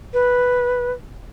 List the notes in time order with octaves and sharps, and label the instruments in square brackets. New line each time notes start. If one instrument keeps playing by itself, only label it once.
[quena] B4